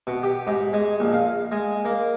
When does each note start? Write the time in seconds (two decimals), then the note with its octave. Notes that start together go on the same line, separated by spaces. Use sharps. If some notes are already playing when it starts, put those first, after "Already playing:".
0.07 B2
0.23 G4
0.47 G#2
0.73 G#3
1.00 A#1
1.14 F5
1.52 G#3
1.85 A#3